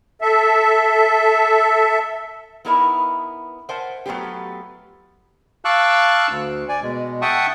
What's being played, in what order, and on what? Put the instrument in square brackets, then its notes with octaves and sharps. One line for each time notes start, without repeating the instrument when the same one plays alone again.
[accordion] A4 E5
[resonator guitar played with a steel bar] B3 D#4 E4 A#4 B4 E5
A#4 C5 E5 F#5 G#5 A5
F#3 A3 B3 F4 G4
[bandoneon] F5 A5 C#6 D6 E6 F#6
D2
D5 G#5
B2 G#3
E5 F#5 G5 A5 C#6 D#6